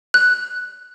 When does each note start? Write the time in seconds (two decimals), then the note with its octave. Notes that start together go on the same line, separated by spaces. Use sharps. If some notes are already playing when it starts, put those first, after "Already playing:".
0.14 F#6